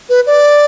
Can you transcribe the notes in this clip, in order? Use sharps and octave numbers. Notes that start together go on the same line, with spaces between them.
B4
D5